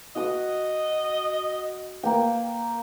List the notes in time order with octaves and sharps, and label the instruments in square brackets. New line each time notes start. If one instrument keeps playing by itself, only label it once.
[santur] F#4 D#6 [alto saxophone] D#5
[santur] A#3 G5